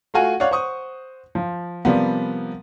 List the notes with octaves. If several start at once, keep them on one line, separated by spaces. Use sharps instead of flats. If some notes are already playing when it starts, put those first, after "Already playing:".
A3 F4 F#4 G#5
C#5 D5 F5 F#5
C5 F#5 C#6 D#6
F3
C3 F3 G3 A#3 B3